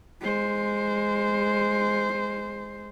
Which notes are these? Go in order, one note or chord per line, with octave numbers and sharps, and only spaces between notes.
G#3 C5